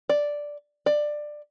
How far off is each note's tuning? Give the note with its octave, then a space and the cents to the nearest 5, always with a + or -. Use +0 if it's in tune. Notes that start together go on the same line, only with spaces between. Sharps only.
D5 +0
D5 +15